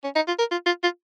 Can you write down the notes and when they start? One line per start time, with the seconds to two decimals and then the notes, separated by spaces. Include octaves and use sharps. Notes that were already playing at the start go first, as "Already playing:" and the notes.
0.04 C#4
0.15 D#4
0.28 F4
0.39 A#4
0.51 F4
0.66 F4
0.83 F4